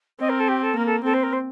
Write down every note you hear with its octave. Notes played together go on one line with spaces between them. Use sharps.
C4 D#5
A#4
A4
G4
A4
A#3 A#4
A4
C4 A4
C5
A#4
C5